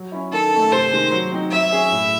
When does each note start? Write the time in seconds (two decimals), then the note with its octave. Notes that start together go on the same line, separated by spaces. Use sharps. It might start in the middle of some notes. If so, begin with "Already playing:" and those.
Already playing: F#3
0.12 C#4 E4
0.32 D#3 A4
0.52 A3 C#4
0.72 C3 C5
0.92 D#3 G#3
1.12 F#3
1.32 C4 D#4
1.51 F#3 E5
1.71 C#4 G#4
1.91 A2